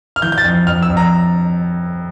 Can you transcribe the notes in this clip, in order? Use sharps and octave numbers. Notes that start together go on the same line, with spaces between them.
F6
E3 G6
G6
A6
F2
F2 F6
E6
F2
A#5